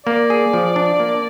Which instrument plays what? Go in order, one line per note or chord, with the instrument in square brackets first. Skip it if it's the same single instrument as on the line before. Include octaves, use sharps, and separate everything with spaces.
[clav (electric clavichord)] A#3 [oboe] D5
[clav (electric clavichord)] G#4
F3
D4
A#3